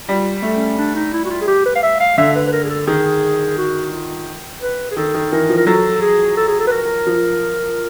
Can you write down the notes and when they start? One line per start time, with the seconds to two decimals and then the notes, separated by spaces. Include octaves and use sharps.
0.08 G3 F4
0.42 A3
0.54 C#4
0.78 D4
0.95 D#4
1.13 E4
1.25 F#4
1.30 F4
1.41 G#4
1.48 G4
1.65 B4
1.75 F5
1.83 E5
2.00 F5
2.18 D3 E5
2.35 B4
2.47 B4
2.52 A#4
2.63 G#4
2.70 A4
2.87 D#3 G#4
3.58 F#4
3.92 F4
4.62 B4
4.91 G#4
4.97 D#3 A4
5.14 D#3
5.31 E3 A#4
5.49 F3
5.57 A#4
5.67 F#3 A4
6.02 G#4
6.37 A4
6.48 G#4
6.59 A4
6.67 B4
6.71 A#4
7.06 F3